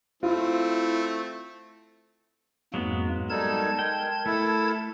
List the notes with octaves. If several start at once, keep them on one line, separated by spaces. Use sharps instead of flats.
A3 C4 E4 F4
F2 G#2 F#3 G#3 A#3 B3
G3 D#4 A4 A#4 A5 G#6
G#3 G5
A3 E4 A4